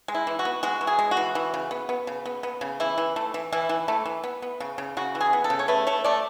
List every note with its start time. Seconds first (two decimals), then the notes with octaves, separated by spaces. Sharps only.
0.08 G#3
0.15 E4
0.27 E3
0.39 F#4
0.45 B3
0.63 G#3 F#4
0.81 E3
0.87 G#4
0.99 G#3
1.11 F#4
1.17 E3
1.35 E3
1.54 C#3
1.71 B3
1.89 B3
2.07 C#3
2.26 B3
2.43 B3
2.61 C#3
2.80 E3 E4
2.98 E3
3.16 A3
3.34 E3
3.53 E3 E4
3.69 E3
3.88 A3
4.06 E3
4.24 B3
4.42 B3
4.60 C#3
4.78 C#3
4.97 C#3 F#4
5.15 E3
5.21 G#4
5.33 B3
5.44 A4
5.50 C#3
5.59 C#5
5.68 A3 B4
5.87 A3 C#5
6.04 A3 D5